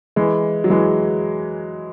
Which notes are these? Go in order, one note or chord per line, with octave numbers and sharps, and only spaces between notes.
E3 G#3
F#3
E3 G#3